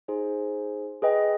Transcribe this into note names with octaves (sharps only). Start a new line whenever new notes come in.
D#4 G#4 C5
G#4 B4 D#5 G5